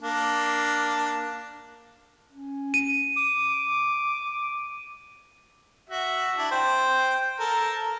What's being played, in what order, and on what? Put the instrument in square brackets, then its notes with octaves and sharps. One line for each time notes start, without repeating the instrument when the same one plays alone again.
[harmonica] A#3 D4
[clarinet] C#4
[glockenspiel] D#7
[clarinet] D6
[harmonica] F#4 E5
D4 E4
C5 G5
A4 A#4